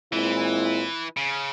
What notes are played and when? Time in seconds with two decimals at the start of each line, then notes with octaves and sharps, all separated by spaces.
0.13 A#2 E3 G#3 C4 E4
1.17 C#3